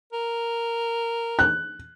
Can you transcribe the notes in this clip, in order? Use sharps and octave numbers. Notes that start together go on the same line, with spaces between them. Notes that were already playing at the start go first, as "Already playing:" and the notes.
A#4
F#6